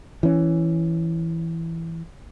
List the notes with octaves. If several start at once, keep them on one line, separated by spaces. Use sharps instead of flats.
E3 C#4